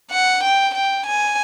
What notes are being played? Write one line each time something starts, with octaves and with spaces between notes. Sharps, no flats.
F#5
G5
G5
G#5